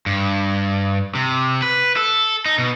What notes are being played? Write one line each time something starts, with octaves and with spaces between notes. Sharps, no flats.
G2
C3
B4
A4
D#4
B2